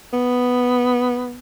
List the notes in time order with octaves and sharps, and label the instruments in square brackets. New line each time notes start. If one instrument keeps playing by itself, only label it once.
[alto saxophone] B3